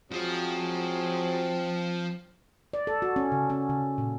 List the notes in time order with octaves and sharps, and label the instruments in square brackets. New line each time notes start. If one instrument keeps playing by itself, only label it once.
[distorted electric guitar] F3 [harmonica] F#3 G#3 [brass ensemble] C4
[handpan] D5
A4
F#4
C#4
C#3
C#4
C#3
A#2